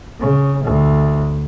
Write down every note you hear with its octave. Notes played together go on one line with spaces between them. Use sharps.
C#3
D2